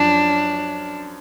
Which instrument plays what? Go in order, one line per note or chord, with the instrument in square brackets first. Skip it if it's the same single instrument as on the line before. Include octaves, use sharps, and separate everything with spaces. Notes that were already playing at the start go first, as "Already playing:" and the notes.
Already playing: [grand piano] F#2 F3 [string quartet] D4